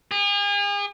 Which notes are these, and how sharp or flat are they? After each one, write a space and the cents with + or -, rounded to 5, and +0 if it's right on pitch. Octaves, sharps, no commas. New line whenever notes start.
G#4 -40